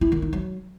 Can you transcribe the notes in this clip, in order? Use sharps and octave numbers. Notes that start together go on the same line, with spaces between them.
E4
D#3
D#4
F#3